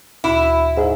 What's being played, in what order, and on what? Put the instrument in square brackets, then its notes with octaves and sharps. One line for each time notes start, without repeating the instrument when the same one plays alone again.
[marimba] D2 A#2 F#4 [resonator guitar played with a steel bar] E4
[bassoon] G#2 [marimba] E4 C5 E5